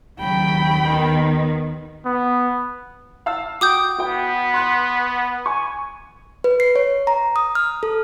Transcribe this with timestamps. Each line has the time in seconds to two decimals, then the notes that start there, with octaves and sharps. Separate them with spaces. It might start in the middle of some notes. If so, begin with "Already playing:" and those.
0.19 D#2 C#3 F#3 G5 B5
0.78 D#3 B3
2.06 B3
3.26 F5 A5 E6
3.61 F#4 G5 D6 D#6 G6
3.99 B3 F#4 G5
4.54 C6 F#6
5.46 G#5 C#6
6.44 B4
6.60 C7
6.76 C#5
7.07 A#5
7.36 D#6
7.55 F6
7.83 A4